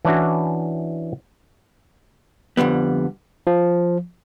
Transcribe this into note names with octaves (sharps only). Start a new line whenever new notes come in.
E3 C#4 D4 E4 F#4
F2 D3 G3 B3
F3